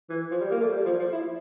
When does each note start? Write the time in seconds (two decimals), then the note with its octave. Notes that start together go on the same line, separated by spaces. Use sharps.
0.10 E3
0.31 F3
0.41 G3
0.51 A#3
0.61 A3
0.71 G3
0.85 F3
0.99 F3
1.12 E4